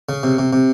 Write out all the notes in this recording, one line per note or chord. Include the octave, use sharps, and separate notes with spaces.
C#3
C3
C3
C3